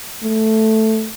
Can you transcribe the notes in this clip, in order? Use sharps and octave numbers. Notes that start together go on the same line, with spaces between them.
A3